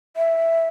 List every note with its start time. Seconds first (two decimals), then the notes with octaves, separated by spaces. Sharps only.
0.17 E5